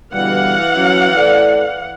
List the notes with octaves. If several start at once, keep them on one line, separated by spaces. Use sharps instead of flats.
B2 D3 E3 G3 F5 F#5
F#3 C#4
A2 A4 D5